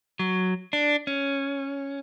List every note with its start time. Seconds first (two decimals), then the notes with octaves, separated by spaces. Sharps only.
0.19 F#3
0.73 D4
1.07 C#4